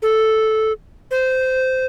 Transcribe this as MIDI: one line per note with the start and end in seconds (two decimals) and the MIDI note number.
0.02 0.73 69
1.11 1.86 72